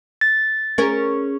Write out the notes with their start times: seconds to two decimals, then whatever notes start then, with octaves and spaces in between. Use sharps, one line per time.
0.21 A6
0.78 C#4 G#4 A#4